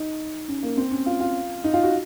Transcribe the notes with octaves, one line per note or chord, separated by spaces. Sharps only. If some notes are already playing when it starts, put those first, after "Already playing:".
Already playing: D#4
C#4
A#3
C4
C#4
F4
F4
D#4
F4
F#4